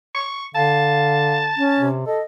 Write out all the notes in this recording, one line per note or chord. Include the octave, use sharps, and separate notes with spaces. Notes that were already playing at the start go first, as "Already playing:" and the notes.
C#6
D3 F5 A5
C#4
C3
A4 D#5